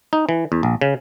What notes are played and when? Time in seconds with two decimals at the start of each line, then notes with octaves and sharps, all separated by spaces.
0.13 D#4
0.29 E3
0.52 E2
0.63 A#1
0.81 C#3